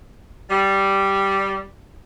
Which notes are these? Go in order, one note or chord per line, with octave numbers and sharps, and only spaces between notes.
G3